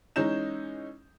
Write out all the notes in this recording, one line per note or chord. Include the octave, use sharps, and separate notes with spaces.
E3 G#3 C#4 D#4 G6 E7